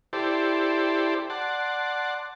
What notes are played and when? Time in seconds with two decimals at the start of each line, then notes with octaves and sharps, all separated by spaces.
0.13 E4 G4 A4 C5 D5
1.30 D5 F#5 A5 C6